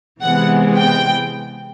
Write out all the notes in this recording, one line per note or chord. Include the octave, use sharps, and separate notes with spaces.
C3 E3 G#3 B3 F#5
G5